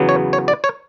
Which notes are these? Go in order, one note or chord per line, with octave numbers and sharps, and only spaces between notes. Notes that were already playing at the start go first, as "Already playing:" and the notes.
Already playing: E2 C#3 F#3 B3
C#5
C#5
D5
C#5